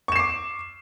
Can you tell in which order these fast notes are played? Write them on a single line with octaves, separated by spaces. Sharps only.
C#6 E7 C7 D6